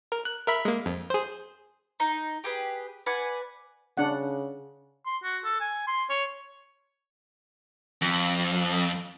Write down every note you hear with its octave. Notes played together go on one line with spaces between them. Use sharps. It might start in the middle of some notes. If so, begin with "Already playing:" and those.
A#4
F#6
A#4 E5 B5
G#3 A#3
F2
G#4 C5
D#4
G4 G#4 B4
B4 D5 F#5 G#5
C#3 D4 F#5
C6
F#4
A4
G#5
C6
C#5
F2